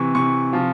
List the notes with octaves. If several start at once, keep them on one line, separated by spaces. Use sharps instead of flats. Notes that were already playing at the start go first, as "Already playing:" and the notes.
Already playing: C3 E3 C#6
C3 E3 C#6
C3 F3